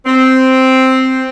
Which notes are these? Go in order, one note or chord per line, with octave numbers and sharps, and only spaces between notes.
C4